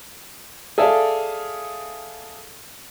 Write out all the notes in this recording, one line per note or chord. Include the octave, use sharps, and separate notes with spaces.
G#4 A4 D5 E5 F5